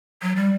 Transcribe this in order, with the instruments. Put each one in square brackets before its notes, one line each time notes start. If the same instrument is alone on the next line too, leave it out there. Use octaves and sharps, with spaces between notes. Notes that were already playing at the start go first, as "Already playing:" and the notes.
[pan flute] F#3
G3